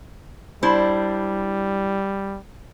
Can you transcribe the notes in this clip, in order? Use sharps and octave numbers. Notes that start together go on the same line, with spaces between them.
G3 D4 E4 C5